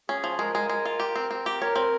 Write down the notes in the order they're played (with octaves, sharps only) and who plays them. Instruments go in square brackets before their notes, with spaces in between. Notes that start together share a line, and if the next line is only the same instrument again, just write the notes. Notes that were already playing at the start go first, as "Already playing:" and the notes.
[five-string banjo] C#4 [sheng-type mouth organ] G#4
[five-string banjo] F3
[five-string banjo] G#3 [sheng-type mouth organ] A#4
[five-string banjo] G#3
G#3
F4
G4
C4
C4
G4
[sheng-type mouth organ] A#4 [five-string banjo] C#5
[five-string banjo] C4